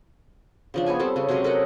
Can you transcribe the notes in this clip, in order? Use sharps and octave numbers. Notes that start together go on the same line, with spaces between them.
C#3 F3 D4
B3 G#4 C#5 G#5
G3 C4 A4
C#3 C#4
C3 F#3 G#3 C#4
A4 A#4 D#5 F#5